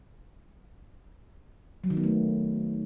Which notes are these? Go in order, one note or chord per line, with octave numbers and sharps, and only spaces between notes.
F#3
D#3
B3
A3